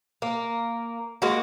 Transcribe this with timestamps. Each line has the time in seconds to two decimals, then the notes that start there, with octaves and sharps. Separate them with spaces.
0.22 A#3
1.22 G#3 A#3 F#4